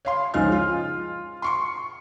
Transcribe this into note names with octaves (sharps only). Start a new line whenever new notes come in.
C#5 F5 C6
C#2 F3 G#3 D#4 D#5 F6
F4
C6 C#6 C#7